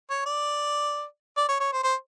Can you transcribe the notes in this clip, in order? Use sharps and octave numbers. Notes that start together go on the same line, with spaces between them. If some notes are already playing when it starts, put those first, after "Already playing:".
C#5
D5
D5
C#5
C#5
C5
C5